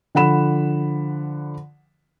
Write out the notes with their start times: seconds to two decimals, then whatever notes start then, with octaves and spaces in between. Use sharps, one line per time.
0.15 D3 F3 F#5 B5 E7